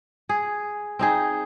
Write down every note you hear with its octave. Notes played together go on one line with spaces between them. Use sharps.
G#4
C4 D#4 G#4